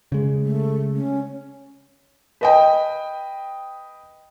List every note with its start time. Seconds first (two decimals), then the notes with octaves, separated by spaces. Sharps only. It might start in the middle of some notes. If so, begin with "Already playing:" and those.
0.12 C#3 G#3
0.43 A3
0.95 C#4
2.41 B4 D#5 G5